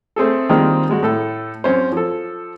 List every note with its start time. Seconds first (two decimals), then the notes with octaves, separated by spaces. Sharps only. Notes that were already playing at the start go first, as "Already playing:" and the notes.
0.16 A3 C4 G#4 A4
0.49 D#3 F3 G3 G#3 A#3 C4
0.89 G3 G#3 F#4
1.03 A2 A4
1.64 F#2 C4 C#4 C5
1.92 F3 A4